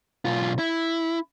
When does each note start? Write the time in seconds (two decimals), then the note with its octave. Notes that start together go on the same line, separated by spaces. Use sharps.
0.25 B1 F4
0.59 E4